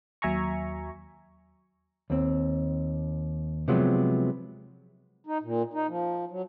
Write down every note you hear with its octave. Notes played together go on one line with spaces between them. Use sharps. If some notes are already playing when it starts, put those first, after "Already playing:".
D#2 F#3 E5 G#5 A#5 C#6
D#2 C4
C3 F3 F#3 G#3 B3
D#4
A#2
D#4
F3
F#3